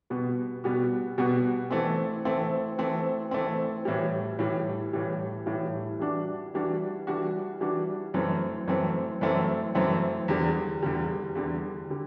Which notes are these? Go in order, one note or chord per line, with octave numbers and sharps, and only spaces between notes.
B2 G3 B3 F#4
B2 G3 B3 F#4
B2 G3 B3 F#4
E3 A3 C4
E3 A3 C4
E3 A3 C4
E3 A3 C4
A2 E3 G3
A2 E3 G3
A2 E3 G3
A2 E3 G3
E3 G3 D4 F#4
E3 G3 D4 F#4
E3 G3 D4 F#4
E3 G3 D4 F#4
F#2 E3 A3 C4
F#2 E3 A3 C4
F#2 E3 A3 C4
F#2 E3 A3 C4
E2 D3 G3
E2 D3 G3
E2 D3 G3
D3 G3